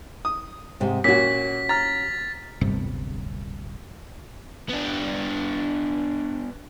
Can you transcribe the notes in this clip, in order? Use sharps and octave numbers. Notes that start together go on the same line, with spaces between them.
D#6
G#2 C3
A#2 C#4 F#4 B6
A#5 F6 A6
D1 G1 G2 C3
B3 D4